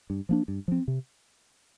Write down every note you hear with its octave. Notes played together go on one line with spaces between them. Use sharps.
G2
F3 A#3 D4
G2
F3 C4
C3